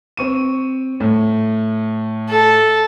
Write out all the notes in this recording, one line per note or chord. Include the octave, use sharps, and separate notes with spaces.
C4 C#6 D#7
A2
A4